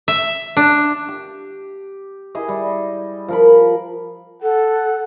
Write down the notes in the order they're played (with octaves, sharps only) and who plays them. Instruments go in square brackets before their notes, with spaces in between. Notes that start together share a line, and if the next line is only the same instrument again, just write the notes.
[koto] E5
D4
[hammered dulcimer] G4
E4 G4 G#4 D#5
G3
F3 A#4 B5
[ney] A4 [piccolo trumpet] F#5